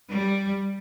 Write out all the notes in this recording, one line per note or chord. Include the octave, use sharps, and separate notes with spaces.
G3